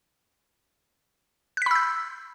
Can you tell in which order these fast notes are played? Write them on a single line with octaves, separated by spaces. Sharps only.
F#6 B6 B5 E6 G6